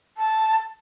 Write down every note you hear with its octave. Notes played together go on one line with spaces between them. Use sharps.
A5